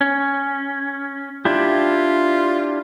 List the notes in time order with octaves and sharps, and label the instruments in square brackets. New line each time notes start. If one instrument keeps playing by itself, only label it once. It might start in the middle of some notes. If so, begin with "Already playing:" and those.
[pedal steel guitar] C#4
[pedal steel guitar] D4 E4 G4 [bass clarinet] F4